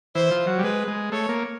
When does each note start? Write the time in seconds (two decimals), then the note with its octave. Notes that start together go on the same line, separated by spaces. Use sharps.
0.15 E3 C5
0.31 F3
0.47 F#3
0.59 G3
0.64 G#3 B4
0.88 G#3
1.12 A3 C#5
1.29 A#3